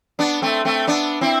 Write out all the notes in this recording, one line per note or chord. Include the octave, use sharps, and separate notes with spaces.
B3 D4
A3 C4
A3 C4
B3 D4
C4 E4